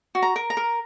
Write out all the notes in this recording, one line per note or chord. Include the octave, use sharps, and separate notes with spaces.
F#4
A#5
A#4
A#5
A#4